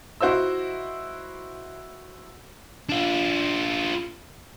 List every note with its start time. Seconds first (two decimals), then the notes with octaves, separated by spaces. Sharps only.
0.21 E4 F#4 C5 D#5 E6
2.89 D4 F4